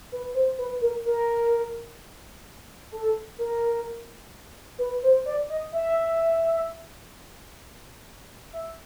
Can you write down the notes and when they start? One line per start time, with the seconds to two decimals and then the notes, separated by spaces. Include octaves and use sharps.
0.12 B4
0.34 C5
0.58 B4
0.81 A#4
1.06 A#4
2.92 A4
3.38 A#4
4.78 B4
5.03 C5
5.26 D5
5.50 D#5
5.72 E5
8.53 E5